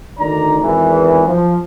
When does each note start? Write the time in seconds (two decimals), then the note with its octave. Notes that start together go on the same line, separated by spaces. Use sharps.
0.18 D2 D#3 D4 D#4 D5 A#5
0.61 G#1 E2 E3
1.27 F3